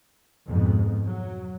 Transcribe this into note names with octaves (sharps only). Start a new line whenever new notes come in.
F2 G#2 B2
F#3